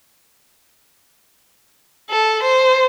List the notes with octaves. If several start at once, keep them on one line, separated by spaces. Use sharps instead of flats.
A4
C5